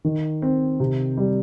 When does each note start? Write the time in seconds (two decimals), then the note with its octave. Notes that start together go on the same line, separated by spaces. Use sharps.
0.05 D#3
0.42 C4
0.80 C3
1.17 G3